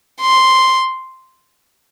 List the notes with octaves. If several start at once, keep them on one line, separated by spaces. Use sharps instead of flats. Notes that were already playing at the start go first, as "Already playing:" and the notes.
C6